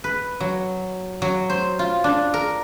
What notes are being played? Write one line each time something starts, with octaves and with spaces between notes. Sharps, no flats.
B4
F#3
F#3
C5
F4
D4
A#4